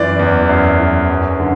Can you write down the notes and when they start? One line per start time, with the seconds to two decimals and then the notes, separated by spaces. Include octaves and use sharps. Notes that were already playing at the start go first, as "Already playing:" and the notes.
Already playing: F#2 E3 D5
0.19 E2
0.49 F#2
0.79 E3
1.09 F#2
1.40 D3